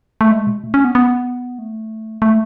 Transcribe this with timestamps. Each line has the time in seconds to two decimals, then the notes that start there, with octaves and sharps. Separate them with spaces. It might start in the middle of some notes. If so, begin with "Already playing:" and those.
0.21 A3
0.31 G#3
0.47 B2
0.64 A3
0.74 C#4
0.84 B3
0.95 B3
1.59 A3
2.22 A3